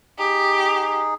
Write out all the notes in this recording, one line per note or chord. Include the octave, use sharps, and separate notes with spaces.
D#4 G4 G#4